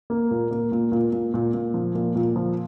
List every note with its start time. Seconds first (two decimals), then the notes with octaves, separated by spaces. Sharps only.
0.10 A#3
0.31 A#2
0.51 A#3
0.72 A#2
0.92 A#2
1.13 A#2
1.34 A#2
1.54 A#2
1.74 F3
1.95 A#2
2.15 A#2
2.36 F3